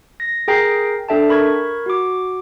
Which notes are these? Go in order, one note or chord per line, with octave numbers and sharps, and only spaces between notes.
A#6
G#4 A#4 G5 A#5 A#6 C7
D4 A4 E5 G5 A5
A#4 B5 C#6 G#6
F#4 D6